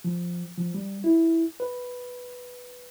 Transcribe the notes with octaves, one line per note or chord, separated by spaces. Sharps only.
F3
F3
G3
E4
B4